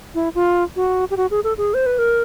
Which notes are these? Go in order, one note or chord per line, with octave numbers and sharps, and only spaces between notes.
E4
F4
F#4
G4
F#4
G#4
A4
G#4
C5
B4
A#4